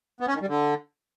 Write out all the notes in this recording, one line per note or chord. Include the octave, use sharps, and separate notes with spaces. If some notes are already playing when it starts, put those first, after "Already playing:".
B3
C#4
D#3
G3
D3